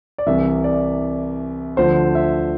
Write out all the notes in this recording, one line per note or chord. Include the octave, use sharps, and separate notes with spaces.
D5
C2 C3 E3 E5
D5
D2 D3 F3 C5
E5